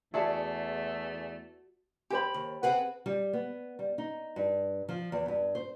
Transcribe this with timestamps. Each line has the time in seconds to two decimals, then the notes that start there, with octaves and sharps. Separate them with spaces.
0.14 E2 A3 F#4 G#4 D5 E5 A5
2.10 E2 G4 C5 B5
2.34 D#2
2.63 C4 G#4 B4 F#5
3.06 G3
3.33 B3
3.79 G3
3.98 D#4
4.36 G2
4.89 F3
5.12 E2
5.28 G2
5.55 C5